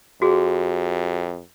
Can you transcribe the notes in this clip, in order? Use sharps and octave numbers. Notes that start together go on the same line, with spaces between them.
F2 F#4 G#4